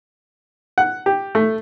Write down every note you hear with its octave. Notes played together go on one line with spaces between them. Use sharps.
F#5
G4
A3